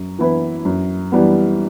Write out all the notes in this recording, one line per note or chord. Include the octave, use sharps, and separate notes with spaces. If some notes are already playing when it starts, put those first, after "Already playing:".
Already playing: F#2
E3 B3 E4 B4
F#2
E3 G3 B3